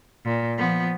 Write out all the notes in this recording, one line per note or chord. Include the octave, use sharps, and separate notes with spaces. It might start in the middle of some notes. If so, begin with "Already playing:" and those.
A#2
F3 B3